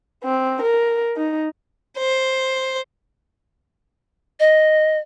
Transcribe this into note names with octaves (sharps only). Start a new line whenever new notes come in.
C4
A#4
D#4
C5
D#5